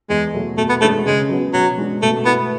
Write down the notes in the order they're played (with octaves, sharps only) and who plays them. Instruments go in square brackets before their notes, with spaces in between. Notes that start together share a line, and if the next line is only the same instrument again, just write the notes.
[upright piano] E2 [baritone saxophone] G#3
[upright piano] B2 F#3 A3
[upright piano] B2 [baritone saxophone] A3
[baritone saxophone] B3
[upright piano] G#3 B3 D4 G#4 [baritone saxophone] A3
[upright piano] C#3 [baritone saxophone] G#3
[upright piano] F#3 B3
[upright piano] B2 [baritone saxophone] F#3
[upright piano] G#3 D4
[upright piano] B2 [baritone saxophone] A3
[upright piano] A3 E4 B4 [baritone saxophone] B3